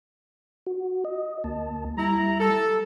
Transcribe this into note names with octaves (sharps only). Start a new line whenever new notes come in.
F#4
D#5
D2 A#3 A5
G3 E4 A#5
A4